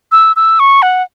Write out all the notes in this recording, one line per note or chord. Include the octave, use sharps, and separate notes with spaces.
E6
E6
C#6
F#5